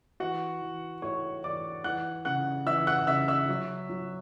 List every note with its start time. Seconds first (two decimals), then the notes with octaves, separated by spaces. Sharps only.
0.20 E3 F#4 F#5
0.62 E3
1.02 A2 C#5 C#6
1.44 E3 D5 D6
1.84 E3 F#5 F#6
2.25 C#3 F#5 F#6
2.66 E3 E5 E6
2.87 F#5 F#6
3.07 C#3 E5 E6
3.28 E5 E6
3.49 F#3
3.89 F#3